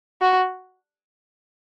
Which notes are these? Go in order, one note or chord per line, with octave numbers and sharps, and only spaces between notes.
F#4